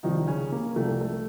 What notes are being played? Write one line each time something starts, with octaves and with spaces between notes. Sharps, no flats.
C2 C3 D#3 F3 D#4
C#3 C#4
A#3
C2 C3 F3 A3
A3